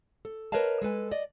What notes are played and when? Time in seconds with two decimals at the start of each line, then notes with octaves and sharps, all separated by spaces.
0.25 A4
0.52 A#4 B4 C#5 D#5 F5 A5
0.82 G#3 A4 B4 G#5
1.11 D5 D#5